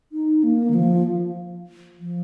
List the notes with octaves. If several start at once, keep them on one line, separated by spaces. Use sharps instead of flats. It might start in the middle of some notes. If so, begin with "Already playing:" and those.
D#4
A#3
D#3
F3
F3